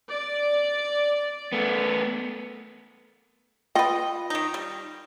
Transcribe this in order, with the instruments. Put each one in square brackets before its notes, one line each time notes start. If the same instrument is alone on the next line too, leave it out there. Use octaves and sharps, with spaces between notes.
[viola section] D5
[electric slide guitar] A3 B3
[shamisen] F4 G5 [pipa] B4 D#5
[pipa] D#3 D#4
G3